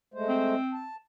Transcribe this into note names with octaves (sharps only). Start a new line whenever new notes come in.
G#3 A3 C5
C4
A5